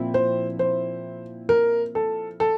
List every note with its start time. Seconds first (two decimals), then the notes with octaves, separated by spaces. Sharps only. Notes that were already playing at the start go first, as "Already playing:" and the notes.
Already playing: A#2 F3 C4 E4
0.14 C5
0.59 C5
1.49 A#4
1.95 A4
2.40 A4